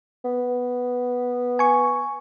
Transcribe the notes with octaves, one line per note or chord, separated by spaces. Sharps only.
B3
G#5 C#6